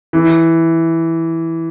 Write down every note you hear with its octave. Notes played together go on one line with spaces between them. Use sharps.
E3